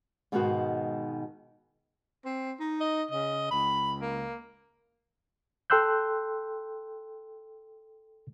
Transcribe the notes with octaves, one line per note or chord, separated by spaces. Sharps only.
G#2 B2 D#3 G#3 B3 F#4
C4
D#4
D#5
C#3 D#5
C#2 B5
A#3
A4 G5 C6 E6 F#6 G6